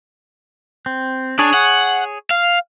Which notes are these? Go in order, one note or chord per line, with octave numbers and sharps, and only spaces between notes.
C4
D4 G#4 C#5
F#5
F5